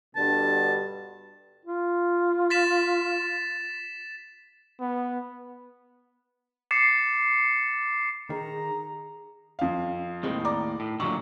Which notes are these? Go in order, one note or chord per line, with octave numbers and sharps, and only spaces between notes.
G2 B2 D3 A5
F4
A6 B6 E7
B3
D6 A6 C7 C#7 E7
D#3 G#4 A#5
F2 F5
D#2 A2 D#3 G#3 C4
D5 A#5 D6
A2
A#2 D3 D#3 F#3 C#6